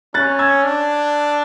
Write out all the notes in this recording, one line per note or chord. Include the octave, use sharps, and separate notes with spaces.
C#4 F#6 A6
E6 G#6
D4